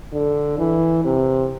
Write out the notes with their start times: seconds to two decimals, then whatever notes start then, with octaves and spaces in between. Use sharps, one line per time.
0.12 D3
0.58 E3
1.04 C3